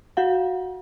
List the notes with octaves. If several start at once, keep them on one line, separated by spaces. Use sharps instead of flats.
F#4 F5 F#5